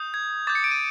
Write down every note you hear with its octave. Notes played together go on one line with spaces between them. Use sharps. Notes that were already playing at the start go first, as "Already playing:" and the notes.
Already playing: D#6 G6
G#6
D6 G6 A6
C#7
D7
D#7